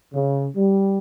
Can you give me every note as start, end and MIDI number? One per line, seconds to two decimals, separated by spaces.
0.13 0.46 49
0.56 0.98 55